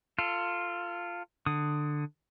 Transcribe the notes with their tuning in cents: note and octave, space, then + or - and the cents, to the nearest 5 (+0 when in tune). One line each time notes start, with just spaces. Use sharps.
F4 -5 A4 +25
D3 +15 D#6 +0